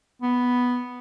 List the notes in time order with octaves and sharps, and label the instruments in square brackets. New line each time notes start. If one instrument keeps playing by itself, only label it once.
[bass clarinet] B3